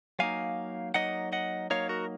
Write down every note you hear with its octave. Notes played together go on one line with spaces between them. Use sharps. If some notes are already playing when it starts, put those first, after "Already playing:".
F#3 A#3 D#4 F5 G#5
F#3 A#3 D#4 D#5 F#5
D#5 F#5
F#3 A#3 D#4 C#5 F5
F#4 A#4